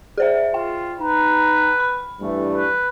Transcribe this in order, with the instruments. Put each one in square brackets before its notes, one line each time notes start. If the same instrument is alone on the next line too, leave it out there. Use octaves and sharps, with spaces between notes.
[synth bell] G#4 C5 E5
[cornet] F4 [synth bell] G5
[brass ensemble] D#4 A#5 [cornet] B4
[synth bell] B5
[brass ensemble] G2 E3 A3
[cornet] B4